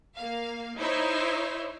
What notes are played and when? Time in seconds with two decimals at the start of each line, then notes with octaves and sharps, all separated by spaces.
0.16 A#3 F5
0.78 D#4 E4 C5 C#5 E5